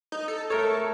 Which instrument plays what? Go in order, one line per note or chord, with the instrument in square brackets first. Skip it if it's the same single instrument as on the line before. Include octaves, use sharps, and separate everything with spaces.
[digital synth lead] D#4
A4
[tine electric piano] A3 A#4 C#5 [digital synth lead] A4